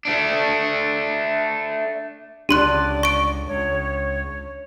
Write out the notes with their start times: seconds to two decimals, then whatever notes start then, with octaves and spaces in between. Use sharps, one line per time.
0.05 A3 D4
2.49 C#2 D4 G4 D5 C6 F#6
3.03 C#6 D7
3.47 C#2 C#5